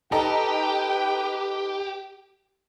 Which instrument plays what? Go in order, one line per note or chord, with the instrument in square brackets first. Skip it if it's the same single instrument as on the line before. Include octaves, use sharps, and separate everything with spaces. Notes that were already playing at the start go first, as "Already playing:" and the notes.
[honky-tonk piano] D#4 A4 A#5 [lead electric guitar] G4 [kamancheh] B4 G5